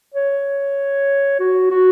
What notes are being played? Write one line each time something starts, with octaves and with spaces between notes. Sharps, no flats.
C#5
F#4
F#4